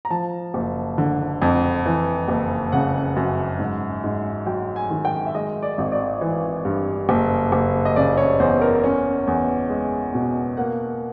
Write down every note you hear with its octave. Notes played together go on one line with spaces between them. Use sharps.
A#5
F3 A5
F#1
D3
F2
E3
F#1
C#3 F#5
F#2
G#2
G#2
F#3 G5
G#5
D#3
G5
E5
G#3 D#5
D5
G#1
D5
E3
G2
F#1
F#1
D#5
C#3 D5
C#5
E2 C5
A#4
C#4
E2
G#3
B2
A#3 F#5